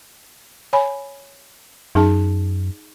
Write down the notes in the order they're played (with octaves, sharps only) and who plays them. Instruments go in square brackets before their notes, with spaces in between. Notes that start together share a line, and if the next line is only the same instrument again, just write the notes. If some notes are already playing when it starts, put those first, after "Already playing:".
[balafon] C#5 G#5 B5
[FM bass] F#2 [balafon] D#4 G#4 A5